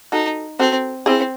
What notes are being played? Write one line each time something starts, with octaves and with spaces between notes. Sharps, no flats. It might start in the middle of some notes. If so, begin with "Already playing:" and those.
D#4 F#4 A4
C4 F#4 A4
C4 E4 G#4